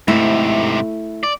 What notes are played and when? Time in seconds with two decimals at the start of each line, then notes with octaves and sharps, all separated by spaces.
0.08 G#2 C3 A3 E4
1.23 D5